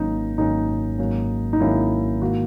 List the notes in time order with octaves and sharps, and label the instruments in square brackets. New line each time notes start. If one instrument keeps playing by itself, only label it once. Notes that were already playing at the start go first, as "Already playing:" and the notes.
Already playing: [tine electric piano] G#1 G#2 F#3 A#3 C#4 [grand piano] D#4
[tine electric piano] G#1 G#2 F#3 A#3 C#4 [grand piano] D#4
[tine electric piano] G#1 G#2 F#3 A#3 C#4
[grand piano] D#4
[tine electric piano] G#1 G#2 F#3 A#3 C#4 [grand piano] E4
[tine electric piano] G#2 D#3 A#3 [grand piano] F#4